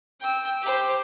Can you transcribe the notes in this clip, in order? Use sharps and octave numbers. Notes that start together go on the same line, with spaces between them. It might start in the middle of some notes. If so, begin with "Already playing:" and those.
G5 E6
G4 C5